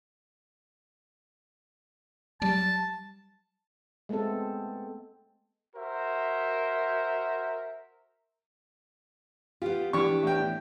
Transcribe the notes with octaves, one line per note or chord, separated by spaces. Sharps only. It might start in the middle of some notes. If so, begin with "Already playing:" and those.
F#3 G3 A5
G#3 A3 B3 C4 A4
F#4 A#4 C5 E5
B3 F4 G4
E3 D4 G4 C#6
A2 G5